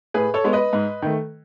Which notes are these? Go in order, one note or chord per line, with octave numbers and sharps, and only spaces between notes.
A2 G#4 B4
A4 C#5
G#3 B3
B4 D#5
G#2
D#3 A3